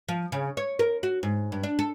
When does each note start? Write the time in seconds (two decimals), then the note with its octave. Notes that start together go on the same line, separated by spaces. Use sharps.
0.09 F3
0.32 C#3
0.57 C#5
0.79 A#4
1.03 F#4
1.23 G#2
1.52 G2
1.63 D4
1.79 A4